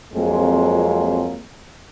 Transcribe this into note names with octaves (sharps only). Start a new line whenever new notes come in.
F2 F#3 G#3 A#3 C4